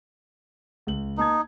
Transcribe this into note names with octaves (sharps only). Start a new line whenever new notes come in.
C#2 F#7
A#3 D#4 A5 G#6